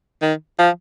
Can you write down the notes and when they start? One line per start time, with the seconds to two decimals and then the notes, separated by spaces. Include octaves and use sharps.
0.22 D#3
0.59 F3